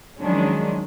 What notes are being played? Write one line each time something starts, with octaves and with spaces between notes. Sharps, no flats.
D#3 F3 F#3 G#3 C#4 D4